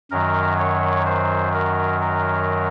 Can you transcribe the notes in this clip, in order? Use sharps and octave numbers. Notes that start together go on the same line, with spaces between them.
F#2 D#3 F#3 A#4
C#5
C5
A#4
A#4